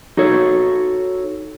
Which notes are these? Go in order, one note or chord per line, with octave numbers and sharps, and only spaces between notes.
D#4 F#4 A4 C#5